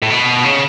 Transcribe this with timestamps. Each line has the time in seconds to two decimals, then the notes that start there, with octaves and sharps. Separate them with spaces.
0.02 A2
0.10 B2
0.45 C#3